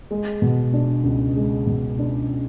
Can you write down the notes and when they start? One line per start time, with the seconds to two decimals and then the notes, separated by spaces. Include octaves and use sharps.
0.11 G#3
0.42 B2
0.73 D4
1.04 C#2
1.36 G#3
1.67 B2
1.99 D4